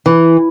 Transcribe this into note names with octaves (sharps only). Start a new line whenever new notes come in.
E3